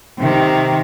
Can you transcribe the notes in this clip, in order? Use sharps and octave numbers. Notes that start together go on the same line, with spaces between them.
C3 D#3